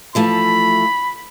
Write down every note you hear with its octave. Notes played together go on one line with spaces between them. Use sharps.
E3 F3 A3 B5